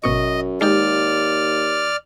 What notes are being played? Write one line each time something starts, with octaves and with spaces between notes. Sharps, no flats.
G#1 F#2 B2 D#5 C#6
D#2 G#3 D#4 G4 D5 F6